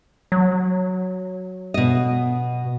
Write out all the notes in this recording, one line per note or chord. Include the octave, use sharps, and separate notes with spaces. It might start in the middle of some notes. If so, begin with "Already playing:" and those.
F#3
B2 D#5